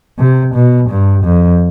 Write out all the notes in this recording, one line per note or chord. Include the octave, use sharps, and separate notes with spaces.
C3
B2
G2
F2